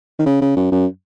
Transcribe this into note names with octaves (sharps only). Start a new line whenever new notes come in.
D#3
C#3
C#3
F#2
F#2